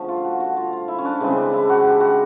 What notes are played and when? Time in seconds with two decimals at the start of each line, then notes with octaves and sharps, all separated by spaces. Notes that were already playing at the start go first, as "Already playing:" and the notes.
Already playing: D3 F3 A3
0.08 F4
0.25 F#4
0.40 F#4
0.57 F4
0.73 F4
0.88 E4
0.98 C#4
1.05 D4
1.20 C#3 E3 G#3 C4
1.37 D4
1.53 E4
1.69 F#4
1.85 G4
2.00 F#4